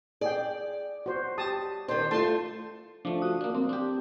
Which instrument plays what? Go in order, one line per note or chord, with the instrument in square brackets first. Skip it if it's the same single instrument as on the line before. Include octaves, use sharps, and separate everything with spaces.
[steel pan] G#4 G5 [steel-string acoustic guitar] D5
[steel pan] F#4 C5
G4 A5 D#6
[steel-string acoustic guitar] D#3 D4 [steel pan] C5
[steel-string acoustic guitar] A3 F4 [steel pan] A5 C6
[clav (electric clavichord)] F3 A3 [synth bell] D4
[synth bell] F#4 D#6
[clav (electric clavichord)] A#3 D4
[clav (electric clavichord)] A#3 [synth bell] C4
[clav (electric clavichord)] D4 G4